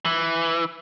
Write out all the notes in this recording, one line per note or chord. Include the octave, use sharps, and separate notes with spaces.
E3